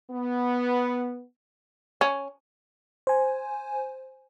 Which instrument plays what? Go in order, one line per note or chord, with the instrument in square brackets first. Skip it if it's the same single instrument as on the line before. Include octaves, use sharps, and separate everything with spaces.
[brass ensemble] B3
[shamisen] C#4
[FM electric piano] C5 G#5